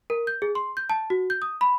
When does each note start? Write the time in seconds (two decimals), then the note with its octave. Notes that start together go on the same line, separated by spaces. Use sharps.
0.10 A#4
0.27 G6
0.42 G#4
0.55 C6
0.77 G6
0.90 A5
1.10 F#4
1.30 G6
1.42 D#6
1.61 B5